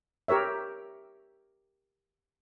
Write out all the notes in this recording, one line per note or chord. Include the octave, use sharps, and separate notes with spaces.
G4 A#4 C#5 E5